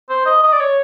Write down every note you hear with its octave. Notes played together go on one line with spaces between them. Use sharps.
C5
D#5
D#5
D5
C#5